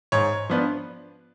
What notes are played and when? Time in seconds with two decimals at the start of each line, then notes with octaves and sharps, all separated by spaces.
0.12 G#2 C#5
0.50 F3 B3 D4